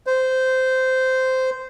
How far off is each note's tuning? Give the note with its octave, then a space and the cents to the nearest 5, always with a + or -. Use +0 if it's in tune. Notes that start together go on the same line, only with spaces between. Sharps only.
C5 -15